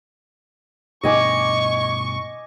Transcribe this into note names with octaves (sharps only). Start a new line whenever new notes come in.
G2 B2 D4 D#5 G#5 C#6 D6